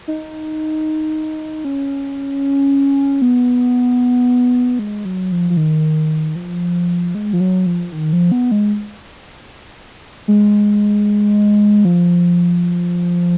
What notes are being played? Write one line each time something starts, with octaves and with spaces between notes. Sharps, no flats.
D#4
C#4
B3
G#3
F#3
F3
F3
D#3
F3
G#3
F3
F#3
F3
D#3
F3
B3
G#3
G#3
F3